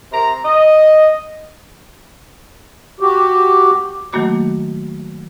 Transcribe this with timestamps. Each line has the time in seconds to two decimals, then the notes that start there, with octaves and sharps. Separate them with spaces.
0.11 C3 A#5
0.44 D#5
3.00 F#4 G4
4.13 D#3 F#3 A3 A#3 F#4 D6